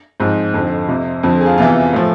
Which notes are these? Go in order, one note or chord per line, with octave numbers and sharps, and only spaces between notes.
G#2 F3 C4
F2 D3 F3
F2 C3 F3
F2 D3 F3 C4
G#4
F4
E2 C3 E3 F4
A2 F3